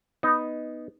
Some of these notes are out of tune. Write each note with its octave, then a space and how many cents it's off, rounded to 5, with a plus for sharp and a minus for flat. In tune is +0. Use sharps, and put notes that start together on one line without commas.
B3 +0 D#4 +0